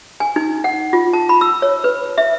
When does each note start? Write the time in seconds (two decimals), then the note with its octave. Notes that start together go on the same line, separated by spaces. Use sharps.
0.20 G#5
0.36 D#4
0.64 F#5
0.93 F4
1.13 A5
1.29 B5
1.41 E6
1.62 C#5
1.84 B4
2.18 E5